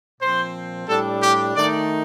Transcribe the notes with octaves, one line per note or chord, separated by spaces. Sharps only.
A#2 F3 C4 C5
A2 G3 D4 A4
G4
D#3 A3 D#4 D5